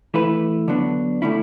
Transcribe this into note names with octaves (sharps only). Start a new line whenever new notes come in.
E3 A3 E4 B4
D3 F#3 B3 D4
D3 A3 C#4 E4